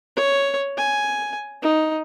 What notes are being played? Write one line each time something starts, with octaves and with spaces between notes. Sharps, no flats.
C#5
G#5
D#4